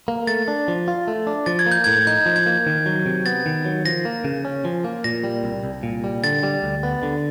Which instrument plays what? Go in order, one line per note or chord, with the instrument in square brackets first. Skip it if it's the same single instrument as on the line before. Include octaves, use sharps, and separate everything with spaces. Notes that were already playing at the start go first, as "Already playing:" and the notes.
[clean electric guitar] A#3
[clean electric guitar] A3 [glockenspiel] A6
[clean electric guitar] D4
F3
F4
A3
D4
[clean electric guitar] F3 [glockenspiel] A6
[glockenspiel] G#6
[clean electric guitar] A#3
[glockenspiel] G6
[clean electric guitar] A2 [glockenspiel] G#6
[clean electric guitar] D#4 [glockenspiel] G6
[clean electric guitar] F3
[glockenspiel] G#6
[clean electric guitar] A#3
D#3
F#3
C3
[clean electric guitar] B3 [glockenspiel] A6
[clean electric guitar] D#3
F#3
[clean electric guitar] F3 [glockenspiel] A#6
[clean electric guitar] A#3
C#3
C#4
F3
A#3
[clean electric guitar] A#2 [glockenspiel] A#6
[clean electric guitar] G3
C2
C2
A#2
G3
[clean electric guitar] D3 [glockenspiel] A6
[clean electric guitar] G3
D2
B3
D3